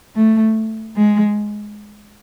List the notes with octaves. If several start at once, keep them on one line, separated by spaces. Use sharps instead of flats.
A3
G#3